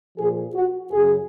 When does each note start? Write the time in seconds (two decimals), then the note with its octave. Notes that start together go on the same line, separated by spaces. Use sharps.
0.17 A#2 F3 G#4
0.54 F#4
0.92 F#2 C#3 F#3 G#4